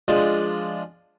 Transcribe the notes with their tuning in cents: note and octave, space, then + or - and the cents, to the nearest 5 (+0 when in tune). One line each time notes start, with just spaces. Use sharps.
F3 +0 G#3 +0 D4 +0